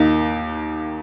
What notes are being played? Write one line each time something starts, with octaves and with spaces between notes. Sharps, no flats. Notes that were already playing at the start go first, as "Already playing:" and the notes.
Already playing: D#2 D#3 A#3 D#4